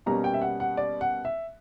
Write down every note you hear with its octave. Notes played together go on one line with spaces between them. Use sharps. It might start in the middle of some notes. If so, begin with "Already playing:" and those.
B2 G3 A#3 C#4 A#5
G5
E5
F#5
F#5
D5
F#5
E5